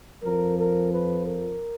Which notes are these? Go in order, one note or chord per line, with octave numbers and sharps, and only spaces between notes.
F2 F3 A#4
A#4
B4
A#4